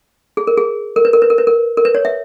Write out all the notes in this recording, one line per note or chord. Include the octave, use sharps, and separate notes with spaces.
G#4
A#4
G#4
A#4
B4
A#4
B4
A#4
B4
A#4
A#4
B4
C#5
E5